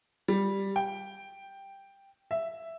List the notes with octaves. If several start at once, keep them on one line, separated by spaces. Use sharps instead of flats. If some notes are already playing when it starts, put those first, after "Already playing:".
G3
G5
E5